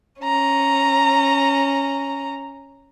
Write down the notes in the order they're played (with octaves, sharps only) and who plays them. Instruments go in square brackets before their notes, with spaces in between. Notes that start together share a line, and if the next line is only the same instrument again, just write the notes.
[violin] C#4 A#5